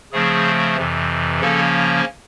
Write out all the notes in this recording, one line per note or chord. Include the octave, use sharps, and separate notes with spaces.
C#3 F3 A3 C4 G#4
F2 C3 E3
C#3 F3 A#3 C#4 A4